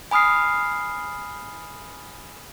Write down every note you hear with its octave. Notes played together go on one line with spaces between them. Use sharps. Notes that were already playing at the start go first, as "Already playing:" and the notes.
G#5 B5 D#6 F6 C7